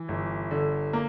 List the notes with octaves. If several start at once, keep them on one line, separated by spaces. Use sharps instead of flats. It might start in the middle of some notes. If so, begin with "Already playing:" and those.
Already playing: E3
G1
D3
A#3